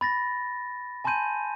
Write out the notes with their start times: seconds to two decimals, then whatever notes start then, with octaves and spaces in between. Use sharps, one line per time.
0.01 B5 A6 A#6
1.04 G#5 A5 B5 C6 G6 D#7